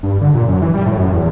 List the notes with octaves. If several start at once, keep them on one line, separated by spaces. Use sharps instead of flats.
G2
D3
A#2
F#2
E3
G3
A2
F#2
E2